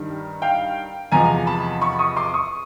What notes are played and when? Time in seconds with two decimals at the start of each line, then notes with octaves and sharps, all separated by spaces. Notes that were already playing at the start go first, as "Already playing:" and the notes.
Already playing: G2 D#3 G3
0.42 F5 G5
1.12 E2 C3 F3 G#3 G#5 A#5
1.47 A5 B5
1.81 B5 C#6
1.99 C#6 D#6
2.17 C6 D6
2.34 C#6 D#6